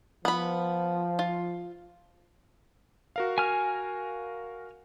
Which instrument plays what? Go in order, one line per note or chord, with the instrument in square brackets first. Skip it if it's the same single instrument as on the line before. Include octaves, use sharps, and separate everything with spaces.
[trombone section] F3 [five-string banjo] B3 B5
[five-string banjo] F4
[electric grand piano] F#4 A#4 F5
[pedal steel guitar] G#5 F6